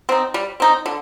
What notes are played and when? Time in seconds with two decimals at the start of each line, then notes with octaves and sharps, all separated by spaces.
0.09 C4 D#4
0.34 G3
0.60 C4 D#4
0.86 D3